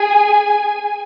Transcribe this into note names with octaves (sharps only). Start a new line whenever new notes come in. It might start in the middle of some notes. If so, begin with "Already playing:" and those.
Already playing: G#4 G#5